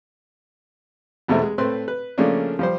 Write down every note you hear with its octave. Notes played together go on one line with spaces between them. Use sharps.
E2 B2 G#3 A3 C4 E4
G#3
A2 A3 C4 B4 C6
B4
C#3 F3 A3 A#3 C#4 D4
F3 G3 C5